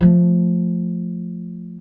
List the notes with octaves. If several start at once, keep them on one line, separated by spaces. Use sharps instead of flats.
F3 A3